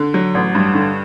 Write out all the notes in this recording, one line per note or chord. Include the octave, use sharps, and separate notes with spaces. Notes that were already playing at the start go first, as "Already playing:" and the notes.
Already playing: D3
F#3
A1
G2
D3